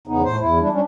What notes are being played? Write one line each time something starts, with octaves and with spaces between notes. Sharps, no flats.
E2 C#3 B3 D#4
A2 C5
E2 E4
G3 D4 E4
G3 C#4 D4